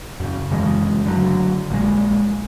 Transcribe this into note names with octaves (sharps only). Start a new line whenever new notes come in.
F#2 C#3
F#2 C#3 E3 G#3
D3 F#3
A#1 A#2 D#3 G#3